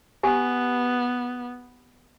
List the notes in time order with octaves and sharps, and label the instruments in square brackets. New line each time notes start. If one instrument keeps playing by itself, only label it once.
[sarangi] B3 [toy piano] G4 G#5